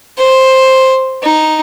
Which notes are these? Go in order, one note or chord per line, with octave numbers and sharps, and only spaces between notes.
C5
D#4